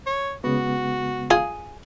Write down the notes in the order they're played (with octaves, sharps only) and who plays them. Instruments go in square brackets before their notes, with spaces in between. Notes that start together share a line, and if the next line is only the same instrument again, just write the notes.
[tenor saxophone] C#5
[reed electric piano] C#3 G#3 B3 [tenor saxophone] F#4
[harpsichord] F4 [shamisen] G#4